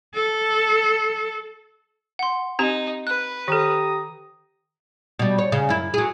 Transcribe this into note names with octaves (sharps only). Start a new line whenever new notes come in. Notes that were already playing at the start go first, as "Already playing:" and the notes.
A4
F#5 C6
C4 D#4 G4 A#5
B4 F#6
D#3 G4 A4 A#5 D#6
B2 G3
C#5
C#3
F#2 E4
F#3 G#4